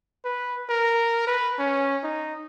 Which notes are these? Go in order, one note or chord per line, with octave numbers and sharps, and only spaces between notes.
B4
A#4
B4
C#4
D#4